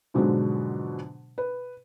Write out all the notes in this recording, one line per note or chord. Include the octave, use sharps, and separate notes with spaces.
G#2 B2 D3 F3 F#3 G#3
B4